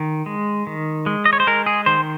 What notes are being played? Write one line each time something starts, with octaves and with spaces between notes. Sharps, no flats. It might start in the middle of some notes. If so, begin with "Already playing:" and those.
Already playing: D#3
G#3
D#3
G#3
D#5
C#5
C5
G#3 A#4
G#4
D#3 C5